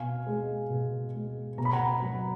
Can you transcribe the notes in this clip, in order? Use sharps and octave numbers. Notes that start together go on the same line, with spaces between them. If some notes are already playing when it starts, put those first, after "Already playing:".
Already playing: B2 F5 G#5
G#3
B2
G#3
B2 A#5
B5
F#5 A#5
F#3